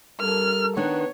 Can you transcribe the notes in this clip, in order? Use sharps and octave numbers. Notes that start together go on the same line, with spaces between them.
G3 A4 A#4 F6
D#3 B3 D4 C#5